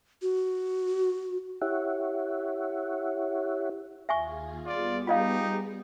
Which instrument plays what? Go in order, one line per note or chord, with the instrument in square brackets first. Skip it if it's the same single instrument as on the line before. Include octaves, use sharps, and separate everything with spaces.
[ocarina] F#4
[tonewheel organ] E4 G4 C#5 E5 F#5
[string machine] D#2 F4 G#4 [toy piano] E5 G#5 C#6
[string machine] G3 B3 G#4 [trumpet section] F4 D5
[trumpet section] D#4 G4 [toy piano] F4 D#5 F5